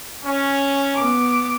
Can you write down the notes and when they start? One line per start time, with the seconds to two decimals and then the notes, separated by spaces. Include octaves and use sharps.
0.24 C#4
0.94 B3 D6